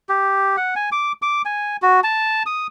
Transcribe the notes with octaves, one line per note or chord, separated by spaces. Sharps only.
G4
F#5
G#5
D6
D6
G#5
F#4
A5
D#6